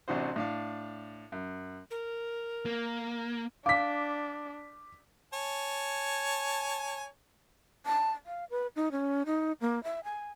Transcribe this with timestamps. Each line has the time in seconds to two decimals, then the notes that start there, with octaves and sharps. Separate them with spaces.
0.08 A1 C3 D4 F#4 C5
0.36 A2 D4 F5
1.32 F#2
1.91 A#4
2.66 A#3
3.66 D4 F5 D6 B6
5.33 C#5 G#5 A5
7.86 A5
8.26 F5
8.50 B4
8.76 D#4
8.92 C#4
9.26 D#4
9.61 A#3
9.84 E5
10.04 G#5